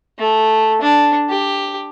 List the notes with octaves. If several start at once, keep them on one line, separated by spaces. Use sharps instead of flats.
A3
D4
G4